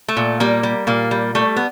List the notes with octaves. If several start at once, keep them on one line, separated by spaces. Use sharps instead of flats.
A3
A#2
G3 A#3
G3
A#2 A#3
G3
G3 A3
B3